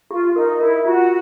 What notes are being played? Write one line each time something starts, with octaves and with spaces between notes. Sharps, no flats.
F4 G4
D#4 A#4
E4 A#4
F4 F#4